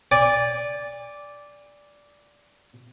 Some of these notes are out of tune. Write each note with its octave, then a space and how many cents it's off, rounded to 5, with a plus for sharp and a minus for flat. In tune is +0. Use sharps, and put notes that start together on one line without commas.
D5 -10 G#5 -40